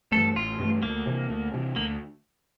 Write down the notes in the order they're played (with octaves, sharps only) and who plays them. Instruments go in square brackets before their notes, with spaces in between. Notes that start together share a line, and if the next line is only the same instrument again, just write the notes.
[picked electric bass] G2 E3 A3 [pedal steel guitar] A4
[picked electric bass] A1 [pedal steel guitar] F4
[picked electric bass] G2 E3 A3
[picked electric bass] D2 [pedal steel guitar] A#3
[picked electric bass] C3 E3
D2
C3 E3
[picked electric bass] D2 [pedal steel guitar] A#3